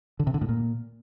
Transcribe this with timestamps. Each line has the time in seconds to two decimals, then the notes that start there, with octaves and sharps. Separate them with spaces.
0.19 D3
0.27 C3
0.34 D3
0.41 A2
0.49 A#2